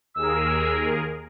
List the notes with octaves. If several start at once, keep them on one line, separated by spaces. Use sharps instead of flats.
D#2 G#4 A#4 E6